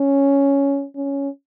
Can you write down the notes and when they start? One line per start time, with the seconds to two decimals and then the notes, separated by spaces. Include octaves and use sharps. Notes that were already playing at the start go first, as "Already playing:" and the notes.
Already playing: C#4
0.96 C#4